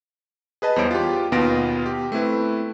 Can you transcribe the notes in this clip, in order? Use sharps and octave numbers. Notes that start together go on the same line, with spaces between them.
G#4 B4 D#5 A5
E2 G3 B3 C5 C#5 D7
F4 G4
D#2 B2 B3 F4 A#6 D7
G4
A3 C4 E4 B4